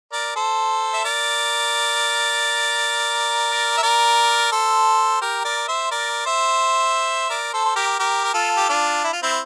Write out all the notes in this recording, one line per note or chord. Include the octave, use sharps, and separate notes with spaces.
A#4 D5
A4 C5
E5
A#4 D5
E5
A#4 D5
A4 C5
G4 A#4
A#4 D5
C5 E5
A#4 D5
C5 E5
A#4 D5
A4 C5
C5
G4 A#4
G4 A#4
A#4
F4 A4
G4
D4 F4
E4
F4
C4 E4